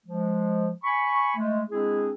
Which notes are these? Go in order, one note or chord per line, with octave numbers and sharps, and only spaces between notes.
F3 G#3
G#5 B5 C#6
G#3 A3
G#3 C4 D4 E4 G#4